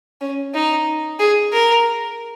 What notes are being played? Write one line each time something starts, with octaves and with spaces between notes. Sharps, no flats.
C#4
D#4
G#4
A#4